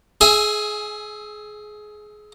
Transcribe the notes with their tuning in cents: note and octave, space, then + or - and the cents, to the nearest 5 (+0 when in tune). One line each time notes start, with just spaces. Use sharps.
G#4 +20 E5 +5 G#5 +0